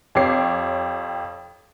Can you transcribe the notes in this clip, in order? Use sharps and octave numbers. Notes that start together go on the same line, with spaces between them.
F2 G4 C#5 D6 C7